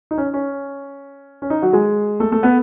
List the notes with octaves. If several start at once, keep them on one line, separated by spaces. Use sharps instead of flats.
D#4
C#4
C#4
C#4
D#4
F#3 F#4
G#3 G#4
A3 A4
A3 A4
B3 B4